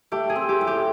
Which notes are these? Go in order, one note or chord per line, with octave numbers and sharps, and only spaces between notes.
A3 G4
G#4
C4
G4
A2
G4